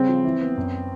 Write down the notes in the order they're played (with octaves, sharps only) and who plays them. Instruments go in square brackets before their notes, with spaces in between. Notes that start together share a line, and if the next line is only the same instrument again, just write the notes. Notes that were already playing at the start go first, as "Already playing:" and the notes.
Already playing: [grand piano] C#3 G3 [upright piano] C4
[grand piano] F3
E3
B3
F#2